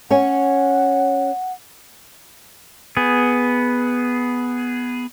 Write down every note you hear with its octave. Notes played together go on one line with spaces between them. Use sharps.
C#4 C#5 F#5 G#5
B3 G#4